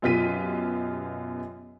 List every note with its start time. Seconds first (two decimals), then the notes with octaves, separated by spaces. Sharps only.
0.02 F#2 B2 F4 G4 B6 D#7